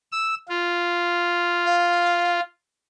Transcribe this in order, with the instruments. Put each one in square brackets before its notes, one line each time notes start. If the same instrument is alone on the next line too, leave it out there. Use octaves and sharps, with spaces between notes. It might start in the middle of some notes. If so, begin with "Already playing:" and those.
[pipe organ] E6
F4
[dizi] F5